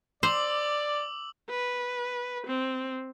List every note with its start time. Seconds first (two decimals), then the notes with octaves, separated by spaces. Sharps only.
0.23 C5 D5 D6 E6 F#7
1.50 B4
2.47 C4